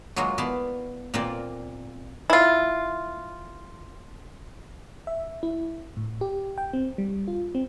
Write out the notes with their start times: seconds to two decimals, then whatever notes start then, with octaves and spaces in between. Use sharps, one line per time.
0.16 F#3 G#3 A#3 F4 F#4
0.38 B3 E4 D5 F5 A5
1.14 A#2 A#3 C4 F4 D5
2.30 E4 F4
5.07 E5
5.43 E4
5.97 A2
6.21 G4
6.58 G5
6.73 C4
6.98 G3
7.28 F4
7.55 C4